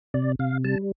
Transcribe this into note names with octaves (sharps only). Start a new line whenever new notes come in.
C3 D5
C3 F5
G3 A5